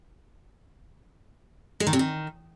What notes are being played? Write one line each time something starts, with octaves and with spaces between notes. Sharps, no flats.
G#3
D#3
C3
D#3